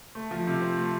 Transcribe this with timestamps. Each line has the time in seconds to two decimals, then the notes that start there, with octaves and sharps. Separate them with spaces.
0.15 A3
0.31 F3
0.47 C3
0.61 C4
0.77 A3